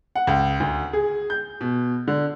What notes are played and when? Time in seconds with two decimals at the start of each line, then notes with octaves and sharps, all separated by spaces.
0.15 F#5
0.27 C#2
0.60 D2
0.93 G#4
1.30 G6
1.61 B2
2.08 D3